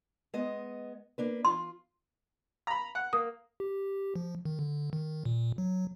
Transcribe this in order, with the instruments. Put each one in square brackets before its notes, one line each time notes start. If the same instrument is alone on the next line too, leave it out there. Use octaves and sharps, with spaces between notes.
[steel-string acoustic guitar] G#3 B3 D#5
A#3 D4 B4
[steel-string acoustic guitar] F4 [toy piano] C6
[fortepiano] A#5 B5
F#5
[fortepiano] A#3 [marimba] D#6
[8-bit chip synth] G4
F3
D#3
D3
D#3
A#2
F#3